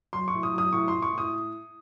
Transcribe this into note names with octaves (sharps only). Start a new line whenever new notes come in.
F#3 C6
C#6
A2
D#6
F#3 D#6
A2 C#6
A2 C6
C#6
A2 D#6